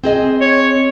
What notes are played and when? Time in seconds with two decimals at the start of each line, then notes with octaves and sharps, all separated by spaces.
0.04 C4 G#4 D#5
0.41 C#5